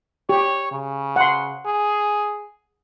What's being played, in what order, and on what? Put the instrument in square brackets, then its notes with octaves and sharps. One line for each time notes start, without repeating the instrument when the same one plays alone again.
[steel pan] G4 [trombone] C#5
[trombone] C#3
[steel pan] F#5 C6
[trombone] G#4